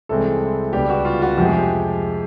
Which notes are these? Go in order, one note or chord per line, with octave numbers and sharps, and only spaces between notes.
C2 C3 E3 G#3 C4 A4
C#2 B2 G3 B3 D4 G4
F#4
F4
F#4
F2 C3 F3 G#3 G4
G#4
G4